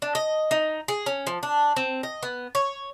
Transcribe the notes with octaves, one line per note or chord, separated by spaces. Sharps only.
D4
D#5
D#4
G#4
C#4
F3
D4
C4
D#5
B3
C#5